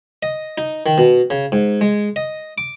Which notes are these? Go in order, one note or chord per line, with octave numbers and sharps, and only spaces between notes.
D#5
D#4
D#3
B2
C#3
G#2
G#3
D#5
D6